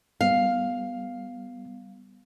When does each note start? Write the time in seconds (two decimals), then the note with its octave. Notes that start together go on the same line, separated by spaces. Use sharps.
0.21 G3 B3 F5